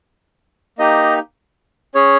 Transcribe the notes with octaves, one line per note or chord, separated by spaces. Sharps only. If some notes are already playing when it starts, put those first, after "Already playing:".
A#3 D#4 G4 D#5
C#4 G#4 C#5